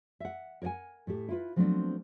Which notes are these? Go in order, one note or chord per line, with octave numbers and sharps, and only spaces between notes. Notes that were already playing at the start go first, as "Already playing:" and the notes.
E5 F#5
A#4 C#5 D5 F#5 G#5
A2 A3 G4
E4 F4 B4
F3 F#3 A3 B3 C4 D4